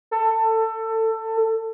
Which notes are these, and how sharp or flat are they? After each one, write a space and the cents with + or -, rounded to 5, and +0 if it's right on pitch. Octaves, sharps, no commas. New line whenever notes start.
A4 +20